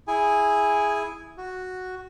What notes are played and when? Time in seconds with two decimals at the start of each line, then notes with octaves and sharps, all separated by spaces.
0.08 E4 G#4 G#5
1.38 F#4